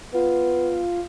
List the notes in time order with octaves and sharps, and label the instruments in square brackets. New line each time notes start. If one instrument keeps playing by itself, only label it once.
[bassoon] B3 [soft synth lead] F4